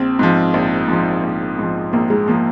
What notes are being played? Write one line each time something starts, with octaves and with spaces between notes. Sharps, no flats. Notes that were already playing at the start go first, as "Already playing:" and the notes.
Already playing: A#1 C4
G#2 F3
A#1
G#2 F3
A#1
G#2 F3
A#1 A#3
G#3
F3 A#3